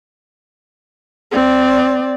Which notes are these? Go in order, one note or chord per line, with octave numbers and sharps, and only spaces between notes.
C4 D5